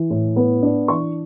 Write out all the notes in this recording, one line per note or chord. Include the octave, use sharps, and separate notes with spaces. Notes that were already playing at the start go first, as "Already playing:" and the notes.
Already playing: E3
A2
B3
D4
E3 C#6